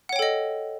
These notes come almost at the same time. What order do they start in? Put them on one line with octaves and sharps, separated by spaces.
F#5 C#5 G5 A4 D#5